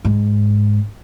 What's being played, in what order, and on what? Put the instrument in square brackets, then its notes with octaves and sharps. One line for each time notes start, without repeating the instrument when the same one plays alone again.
[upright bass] G#2